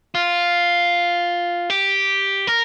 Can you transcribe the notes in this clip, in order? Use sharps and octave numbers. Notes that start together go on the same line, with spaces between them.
F4
G4
A#4